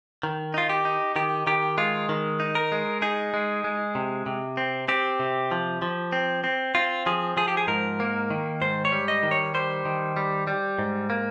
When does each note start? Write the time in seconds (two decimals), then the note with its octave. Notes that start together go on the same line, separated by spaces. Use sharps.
0.23 D#3
0.54 D#4 F4
0.69 G4
0.85 D#4
1.16 D#3 G4
1.47 D#3 G4
1.78 G#3 F4
2.09 D#3
2.40 D#4
2.55 A#4
2.72 G#3
3.02 D#4 G#4
3.34 G#3
3.64 G#3
3.95 C3
4.26 C3
4.57 C4
4.88 C4 G4
5.20 C3
5.51 F3
5.82 F3
6.13 C4
6.44 C4
6.75 C4 F4
7.06 F3 G#4
7.37 F3 G#4
7.48 G4
7.57 G#4
7.67 G#2 A#4
8.00 A#3
8.30 D#3
8.62 G#2 C5
8.85 C#5
8.92 G3
9.08 D#5
9.23 D#3
9.31 C#5
9.54 G3 C5
9.85 D#3
10.17 G3
10.47 G3
10.79 G#2
11.10 A#3